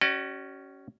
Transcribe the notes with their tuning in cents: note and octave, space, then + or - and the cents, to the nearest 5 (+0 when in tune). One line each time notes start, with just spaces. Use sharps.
C#4 +0 F#4 +45 D5 +45